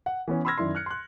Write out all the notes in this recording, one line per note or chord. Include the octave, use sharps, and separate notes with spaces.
F#5
E3 B3 C#4
B5 C6 E6 F6 G#6 A#6
F#2 D#3 E4 D5 C6
F6 F#6 C#7
C6 F#6